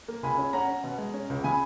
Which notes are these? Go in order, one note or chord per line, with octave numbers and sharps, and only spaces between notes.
A#3
C#2 G#5 B5
C#4
C#4 F#5 A#5
C#4
B2
G#3
C#4
C#2
C#3 G#5 B5